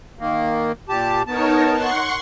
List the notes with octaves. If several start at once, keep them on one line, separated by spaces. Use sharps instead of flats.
D#3 A#3
A#2 G4 A5
B3 D#4 A#4 C#5 A5
F#5 C6 C#6